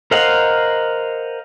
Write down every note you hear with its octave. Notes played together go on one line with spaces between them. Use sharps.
A#4 C5 D#5 F5 F#5